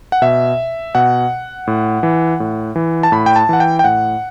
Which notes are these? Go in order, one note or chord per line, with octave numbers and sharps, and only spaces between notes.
F#5
B2 E5
B2 F#5
A2
E3
A2
E3
A5
A2 B5
G5
A5
E3 F#5
G5
G5
A2 F#5